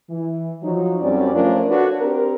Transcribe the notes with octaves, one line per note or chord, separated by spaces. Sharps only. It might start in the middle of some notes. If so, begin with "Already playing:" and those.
E3
F3 F#3 D#4
F#2 G3 C4 C#4 D5
F3 A3 C#4 D4 F4 A#4
D4 F#4 A4 B4 C#5
C4 D4 G4 A#4